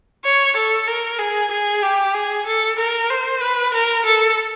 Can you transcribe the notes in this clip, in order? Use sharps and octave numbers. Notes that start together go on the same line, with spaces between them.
C#5
A4
A#4
G#4
G#4
G4
G#4
A4
A#4
C5
B4
A#4
A4